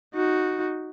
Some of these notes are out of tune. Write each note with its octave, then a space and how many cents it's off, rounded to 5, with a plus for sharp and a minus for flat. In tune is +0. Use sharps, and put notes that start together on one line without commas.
D#4 +0 F#4 +0